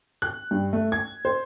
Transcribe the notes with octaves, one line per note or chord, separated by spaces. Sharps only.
F#6
G2
A3
G#6
C5